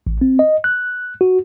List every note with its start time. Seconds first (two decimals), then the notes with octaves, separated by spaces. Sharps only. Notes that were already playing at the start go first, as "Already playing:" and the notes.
0.07 A1
0.21 C4
0.39 D#5
0.64 F#6
1.21 F#4